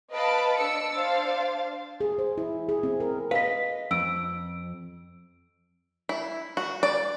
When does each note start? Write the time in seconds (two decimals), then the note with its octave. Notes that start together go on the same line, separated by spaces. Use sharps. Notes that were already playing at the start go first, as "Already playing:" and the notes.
0.12 B4 D#5 F5 A5 B5 D7
0.59 D4 E6 C#7
0.95 D4 C5 F5 A6
2.01 G#4
2.19 C5
2.38 E4
2.69 G#4
2.83 C4
3.00 A#4
3.31 B4 D#5 F5 B6
3.91 F2 E6 D7
6.09 E4
6.57 F#4
6.83 D5